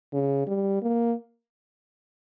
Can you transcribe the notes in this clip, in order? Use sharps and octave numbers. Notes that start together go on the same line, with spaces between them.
C#3
G3
A#3